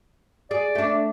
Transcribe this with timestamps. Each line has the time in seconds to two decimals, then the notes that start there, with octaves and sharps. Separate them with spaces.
0.51 G#4 D5
0.75 A3 D4